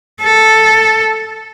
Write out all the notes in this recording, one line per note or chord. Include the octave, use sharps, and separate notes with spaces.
A4